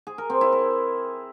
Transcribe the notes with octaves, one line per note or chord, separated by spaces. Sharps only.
G#4
A#4
C4
E4
A#4